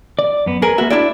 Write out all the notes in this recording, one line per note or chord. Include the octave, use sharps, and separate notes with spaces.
D5
F#2 B3
G#4 A#4 B4 G#5
A#3 F#4 B4 E5
D4 E4 D5 E5